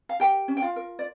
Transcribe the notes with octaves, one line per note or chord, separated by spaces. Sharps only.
F5
G4 A#4 G5
C#4
G5
F4 F5
A#4
D5